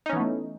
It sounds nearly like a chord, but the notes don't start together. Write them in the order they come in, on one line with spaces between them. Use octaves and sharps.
D#4 C#4 E3 B3 A3